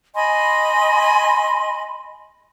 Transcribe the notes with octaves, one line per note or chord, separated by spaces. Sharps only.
D#5 G#5 B5 C6